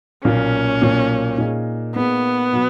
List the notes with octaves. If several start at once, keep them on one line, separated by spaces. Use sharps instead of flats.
B1 A#2 A#3 C#4
B1 A#2 A#3
A#2 A#3 D#4 G#4
A#2 A#3 B3 D#4 G#4
B2 F#3